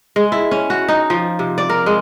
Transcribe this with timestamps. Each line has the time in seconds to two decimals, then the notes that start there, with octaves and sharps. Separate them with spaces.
0.16 G#3
0.32 E4
0.51 C#4
0.70 F#4
0.88 D#4
1.10 F3
1.39 C3
1.58 D5
1.70 A#4
1.86 G#3